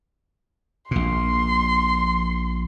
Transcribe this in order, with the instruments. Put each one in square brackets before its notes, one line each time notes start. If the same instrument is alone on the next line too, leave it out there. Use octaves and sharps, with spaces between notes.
[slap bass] A#1 A#2 [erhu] C6